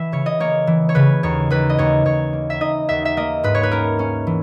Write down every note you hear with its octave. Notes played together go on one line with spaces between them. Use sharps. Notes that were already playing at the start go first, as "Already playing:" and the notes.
Already playing: E3 E5
C#3 C#5
D#5
A#3 C#5
E3
C#5
C#3 B4
D#2 C#5
D#2 B4
D#5
D#2 C#5
D#2 C#5
A#3
E5
D#4 D#5
D#2 E5
E5
A#3 D#5
G#2 B4
C#5
B4
C#4 A#4
C#4
E3